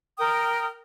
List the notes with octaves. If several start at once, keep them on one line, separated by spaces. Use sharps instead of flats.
A#4 G5 D#6